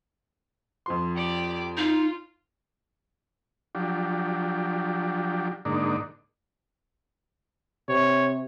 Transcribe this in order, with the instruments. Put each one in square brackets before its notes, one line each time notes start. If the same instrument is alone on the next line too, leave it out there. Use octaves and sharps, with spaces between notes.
[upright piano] F2 F3 C6
[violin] G4 D5
[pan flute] D#4 [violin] F4
[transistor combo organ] F3 F#3 D4 G4
G#2 D3 A#3 D4 D#4
[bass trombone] C3 [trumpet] C#5